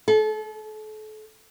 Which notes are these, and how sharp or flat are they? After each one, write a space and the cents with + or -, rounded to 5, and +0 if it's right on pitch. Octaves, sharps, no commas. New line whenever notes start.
A4 -35